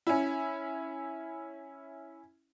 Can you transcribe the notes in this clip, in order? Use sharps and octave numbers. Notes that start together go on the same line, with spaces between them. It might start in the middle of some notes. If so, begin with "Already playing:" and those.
C#4 E4